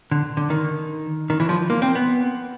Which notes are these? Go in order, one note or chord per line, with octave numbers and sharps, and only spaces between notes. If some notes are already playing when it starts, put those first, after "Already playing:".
D3
D3
D#3
D#3
E3
F3
A#3
C4
B3